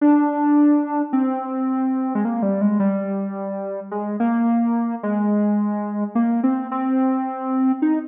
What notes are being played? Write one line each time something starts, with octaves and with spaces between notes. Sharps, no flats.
D4
C4
G#3
A#3
G3
G#3
G3
G#3
A#3
G#3
A#3
C4
C4
D#4